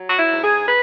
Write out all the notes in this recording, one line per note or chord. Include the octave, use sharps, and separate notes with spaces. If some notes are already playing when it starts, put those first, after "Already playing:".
Already playing: F#3
F#4
E4
G#2
G#4
B4